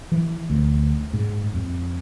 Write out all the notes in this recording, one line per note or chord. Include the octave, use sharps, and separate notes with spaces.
E3
D2
G#2
F2